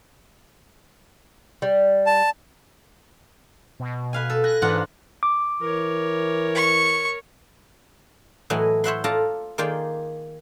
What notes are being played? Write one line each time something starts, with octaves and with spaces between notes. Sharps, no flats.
G3
A5
B2
B4 F5 G#5
A4
G#5 F#6 A#6
G#2 E3 D4 F4 F#5
D6
E3 A#4 C#5
C#6
A2 E3 F#3 D#5 F#5 G#5
C5 C#5 E5 F#5 B5 C6
F4 A4 D5 F5 A5 A#5
D#3 A#3 F4 G#4 D5 G5